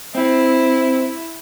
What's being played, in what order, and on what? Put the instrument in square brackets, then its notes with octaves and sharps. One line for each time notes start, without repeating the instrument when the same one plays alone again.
[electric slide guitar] C4 [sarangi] E4